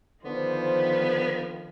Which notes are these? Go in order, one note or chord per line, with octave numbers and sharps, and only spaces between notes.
D3 D#3 F3 B3 C5